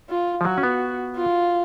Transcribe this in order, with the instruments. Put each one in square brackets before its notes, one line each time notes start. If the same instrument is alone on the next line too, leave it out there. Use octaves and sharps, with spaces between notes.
[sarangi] F4
[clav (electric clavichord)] F3
[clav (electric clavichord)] F#3 [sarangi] F#4
[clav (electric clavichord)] C#4
B3
[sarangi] F4